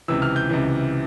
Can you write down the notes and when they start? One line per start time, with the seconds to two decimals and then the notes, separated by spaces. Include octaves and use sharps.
0.08 C#2 C3 E3 E6
0.22 F6
0.36 G6
0.49 C#2 C3 E3